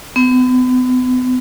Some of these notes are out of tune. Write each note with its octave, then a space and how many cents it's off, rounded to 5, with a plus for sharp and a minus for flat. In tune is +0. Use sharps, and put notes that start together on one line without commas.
B3 +40